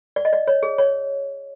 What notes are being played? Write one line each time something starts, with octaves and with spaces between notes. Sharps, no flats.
D5
D#5
D5
C#5
G#4
C#5